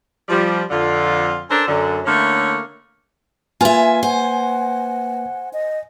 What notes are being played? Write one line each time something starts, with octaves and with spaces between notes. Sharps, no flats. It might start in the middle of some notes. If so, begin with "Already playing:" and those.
F3 G3
F2 D3 F4
C#4 D4 A4 A#4 C5
F#2 D3
D3 A3 A#3 C#4 E4 C#5
A#3 F4 B4 E5 G#5
C5 F#5
D#5